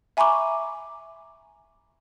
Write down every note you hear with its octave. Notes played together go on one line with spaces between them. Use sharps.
E5 G#5 A#5 B5 C#6 D6